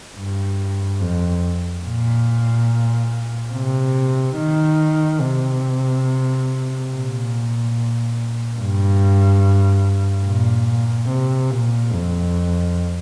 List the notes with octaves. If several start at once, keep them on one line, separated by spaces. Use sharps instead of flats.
G2
F2
A#2
C3
D#3
C3
A#2
G2
A#2
C3
A#2
F2